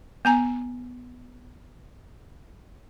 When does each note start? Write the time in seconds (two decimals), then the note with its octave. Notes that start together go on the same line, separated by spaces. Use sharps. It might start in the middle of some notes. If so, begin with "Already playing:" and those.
0.25 B3 G#5 A#5